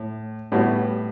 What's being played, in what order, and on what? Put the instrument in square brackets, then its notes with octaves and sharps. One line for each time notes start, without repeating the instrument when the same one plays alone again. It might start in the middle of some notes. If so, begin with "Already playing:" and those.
Already playing: [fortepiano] A2
A2 G3 B3 F#4